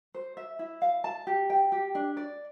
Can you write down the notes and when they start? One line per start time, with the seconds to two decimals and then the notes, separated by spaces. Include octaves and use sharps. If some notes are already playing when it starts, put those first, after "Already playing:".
0.15 C5
0.37 E5
0.59 E4
0.82 F5
1.04 A5
1.27 G4
1.50 G5
1.72 G4
1.95 D4
2.17 D5